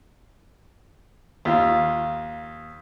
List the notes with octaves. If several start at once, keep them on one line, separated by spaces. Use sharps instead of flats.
D#2 F4